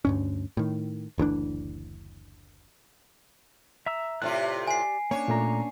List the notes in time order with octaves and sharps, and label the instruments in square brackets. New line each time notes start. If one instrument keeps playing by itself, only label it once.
[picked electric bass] D2 G2 C#4
A2 D#3
F#1 D2 E3 D4
[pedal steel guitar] E5 A#5 E6
[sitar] A2 C3 F4 [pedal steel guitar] G4 D5 F#6
[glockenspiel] G#5 C7
[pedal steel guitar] A#3 C#4 D4 [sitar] C#5
[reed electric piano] A#2 A3 A#5